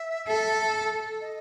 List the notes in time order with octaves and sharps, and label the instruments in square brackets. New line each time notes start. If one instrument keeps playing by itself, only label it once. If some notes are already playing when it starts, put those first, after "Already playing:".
Already playing: [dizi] E5
[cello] A4
[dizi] D#5